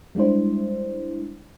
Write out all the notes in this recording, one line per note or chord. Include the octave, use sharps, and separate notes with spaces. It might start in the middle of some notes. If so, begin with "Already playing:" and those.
G3 G#3 D4 E4 C5